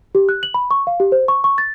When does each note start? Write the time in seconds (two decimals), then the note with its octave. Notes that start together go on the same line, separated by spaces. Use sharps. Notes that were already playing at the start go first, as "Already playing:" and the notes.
0.15 G4
0.29 F#6
0.43 F#7
0.54 B5
0.71 C#6
0.87 F5
1.00 G4
1.12 C5
1.28 C#6
1.44 C#6
1.58 A6